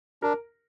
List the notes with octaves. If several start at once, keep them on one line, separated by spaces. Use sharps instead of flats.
D4 A#4